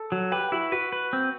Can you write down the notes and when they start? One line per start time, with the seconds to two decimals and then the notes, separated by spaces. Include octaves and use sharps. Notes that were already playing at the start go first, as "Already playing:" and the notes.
Already playing: A4
0.12 F#3
0.32 G4 B4
0.49 G4
0.52 E4 F#4
0.72 F#4 B4
0.93 B4
1.13 C4